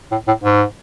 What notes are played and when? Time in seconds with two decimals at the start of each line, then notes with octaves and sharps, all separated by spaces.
0.11 A2
0.27 A2
0.43 G#2